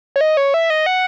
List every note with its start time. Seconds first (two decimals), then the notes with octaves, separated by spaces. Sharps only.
0.16 C#5
0.21 D#5
0.37 C#5
0.54 E5
0.70 D#5
0.86 F#5